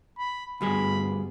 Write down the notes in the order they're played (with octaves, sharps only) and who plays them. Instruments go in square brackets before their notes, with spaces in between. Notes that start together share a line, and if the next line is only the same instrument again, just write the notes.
[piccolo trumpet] B5
[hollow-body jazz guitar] D2 G3 G#4 [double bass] G2 B3 [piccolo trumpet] B5